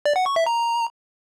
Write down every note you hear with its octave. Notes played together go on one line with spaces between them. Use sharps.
D5
F#5
C#6
E5
A#5